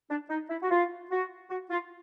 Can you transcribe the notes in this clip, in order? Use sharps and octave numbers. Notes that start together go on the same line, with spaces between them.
D4
D#4
E4
F#4
F4
F#4
F#4
F4